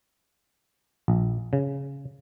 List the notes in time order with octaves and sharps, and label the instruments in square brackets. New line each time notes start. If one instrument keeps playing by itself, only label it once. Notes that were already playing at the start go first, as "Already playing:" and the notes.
[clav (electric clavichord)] A#1
C#3